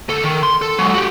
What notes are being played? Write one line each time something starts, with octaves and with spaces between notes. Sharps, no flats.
D2 A4
D#3
C6
A4
F#3 G#3
F#4 G4